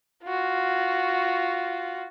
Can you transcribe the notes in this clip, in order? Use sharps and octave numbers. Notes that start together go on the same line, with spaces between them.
F4 F#4